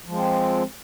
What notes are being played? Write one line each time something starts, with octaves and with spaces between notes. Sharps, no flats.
F3 G#3 C4